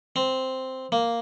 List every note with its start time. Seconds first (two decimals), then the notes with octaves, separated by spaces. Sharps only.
0.16 C4
0.92 A#3